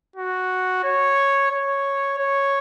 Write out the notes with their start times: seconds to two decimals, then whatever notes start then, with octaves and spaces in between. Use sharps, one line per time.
0.16 F#4
0.84 C#5
1.51 C#5
2.18 C#5